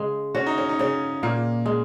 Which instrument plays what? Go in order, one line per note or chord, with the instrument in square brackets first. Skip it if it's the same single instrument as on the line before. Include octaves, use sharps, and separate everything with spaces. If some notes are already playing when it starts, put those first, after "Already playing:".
Already playing: [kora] C#3 G#3
[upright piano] C#4 [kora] F#4
[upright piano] D#4
C#4
D#4
[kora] C#3 [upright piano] C#4
[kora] A#2 [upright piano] A#3
[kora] G#3